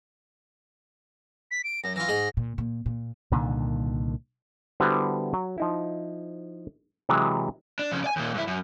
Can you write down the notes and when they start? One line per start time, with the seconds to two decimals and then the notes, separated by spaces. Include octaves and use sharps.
1.51 B6
1.64 D7
1.84 F#2 A#6
1.96 E3 F4 A#6
2.08 G#2 G#4 D#5
2.37 A#2
2.58 A#2
2.86 A#2
3.31 C2 A#2 D3 D#3
4.80 D3 G3 B3 E4 F#4 C5
5.34 F#3
5.58 F3 D#4 E4
7.09 C3 E3 F#3 G#3
7.79 D4
7.92 F2 C#3
8.04 D5 G#5
8.16 D#2 A#2
8.34 G2 E4
8.47 F#2